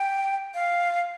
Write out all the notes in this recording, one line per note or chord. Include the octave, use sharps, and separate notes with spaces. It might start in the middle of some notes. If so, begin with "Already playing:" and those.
Already playing: G5
F5